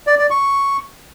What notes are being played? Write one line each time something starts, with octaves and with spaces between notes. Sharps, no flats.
D5
D5
C#6